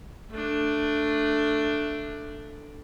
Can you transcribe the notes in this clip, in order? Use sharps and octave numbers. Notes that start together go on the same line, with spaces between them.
A3 D4